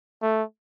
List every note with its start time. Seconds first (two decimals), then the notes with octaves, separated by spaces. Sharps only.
0.22 A3